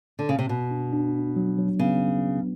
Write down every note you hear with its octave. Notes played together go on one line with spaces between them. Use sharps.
D3
C#3
C3
B2 B3
D4
D4
D4
F#3
F#3
C#3 B3